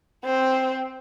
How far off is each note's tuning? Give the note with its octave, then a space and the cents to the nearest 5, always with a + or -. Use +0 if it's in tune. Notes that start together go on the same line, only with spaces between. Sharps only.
C4 +0 C5 +0